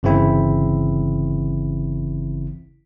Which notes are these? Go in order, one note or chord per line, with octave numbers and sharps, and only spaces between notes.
G1 C#3 E3 C4 E4